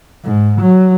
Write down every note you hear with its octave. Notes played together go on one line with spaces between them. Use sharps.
G#2
F#3